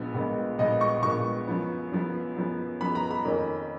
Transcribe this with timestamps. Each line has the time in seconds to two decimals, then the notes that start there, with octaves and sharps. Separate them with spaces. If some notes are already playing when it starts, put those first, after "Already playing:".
Already playing: A#1 A#2 G#3 B3
0.14 A#1 A#2 G#3 B3
0.58 A#1 A#2 G#3 B3 D#5
0.81 C#6
1.03 A#1 A#2 G#3 B3 C#6
1.48 F#2 F3 B3
1.92 F#2 F3 B3
2.36 F#2 F3 B3
2.81 F#2 F3 B3 B5
2.95 A#5
3.11 B5
3.25 F2 D#3 A#3 C#4